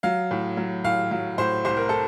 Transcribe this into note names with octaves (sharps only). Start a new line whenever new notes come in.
F#3 F5
A2
F#3
A2 F5
F#3
A2 C5
C2 C5
A#4
A4